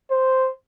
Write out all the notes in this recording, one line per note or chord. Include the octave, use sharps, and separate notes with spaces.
C5